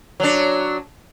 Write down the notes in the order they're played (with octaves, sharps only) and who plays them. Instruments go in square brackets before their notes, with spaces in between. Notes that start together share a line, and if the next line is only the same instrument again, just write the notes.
[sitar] F#3 D4